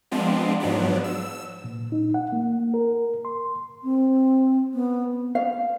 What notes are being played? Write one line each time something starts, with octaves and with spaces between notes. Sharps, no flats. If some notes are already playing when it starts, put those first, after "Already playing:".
F3 G#3 B3 C4 D4 F4
G#2 F3 F#3 B3 D4
E6
A#2
D#4
F#5
A#3
A#4
C6
C4
B3
F5